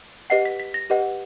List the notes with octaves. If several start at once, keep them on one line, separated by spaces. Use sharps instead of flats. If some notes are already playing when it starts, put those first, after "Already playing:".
G4 B4 D#5 F#5 C7
B6
B6
A#6
G4 B4 D#5 F#5